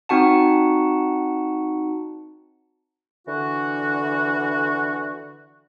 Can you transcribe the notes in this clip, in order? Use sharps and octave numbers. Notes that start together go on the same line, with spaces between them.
C4 D#4 F#4 F#5 A5
D3 E3 F#4